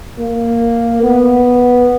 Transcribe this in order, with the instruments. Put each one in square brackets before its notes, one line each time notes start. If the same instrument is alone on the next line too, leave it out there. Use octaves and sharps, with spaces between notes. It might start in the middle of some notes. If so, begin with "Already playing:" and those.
[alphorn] A#3
B3